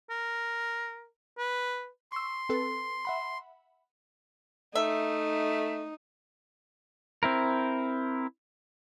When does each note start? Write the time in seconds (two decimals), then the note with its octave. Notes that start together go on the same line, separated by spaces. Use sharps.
0.10 A#4
1.38 B4
2.12 C6 C#6 E6
2.49 C4 A4 B4
3.05 E5 F#5 B5
4.75 A3 D#4 E5
7.23 C4 E4 A#4